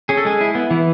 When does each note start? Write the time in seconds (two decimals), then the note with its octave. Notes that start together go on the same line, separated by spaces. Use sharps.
0.09 C#4 G#4
0.18 A4
0.25 G#3 G#4
0.41 E4
0.55 B3
0.71 E3